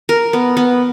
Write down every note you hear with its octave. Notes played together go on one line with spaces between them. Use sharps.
A#4
B3
B3